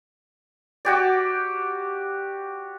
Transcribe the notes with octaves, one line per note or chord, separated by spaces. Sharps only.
F#4 G4 D5